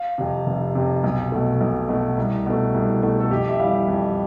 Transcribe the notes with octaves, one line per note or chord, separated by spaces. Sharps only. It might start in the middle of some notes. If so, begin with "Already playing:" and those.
Already playing: F5
F2 C3
F1
F2 C3
B1
B2 A3
B1
B2 A3
C2
B2 A3
C2
B2 A3
A4
F2 G4
E5
E3 G3 F5
F2